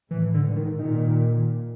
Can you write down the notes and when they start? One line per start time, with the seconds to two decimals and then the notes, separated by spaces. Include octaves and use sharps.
0.11 A2 E3
0.34 D3
0.45 G#2
0.56 D#3
0.79 A#2 D#3